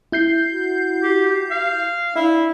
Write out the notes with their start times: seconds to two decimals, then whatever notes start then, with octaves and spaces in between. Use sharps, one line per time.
0.12 E4 G6 C7
0.51 F#4
1.03 G4
1.51 F5
2.16 D4 E4 E5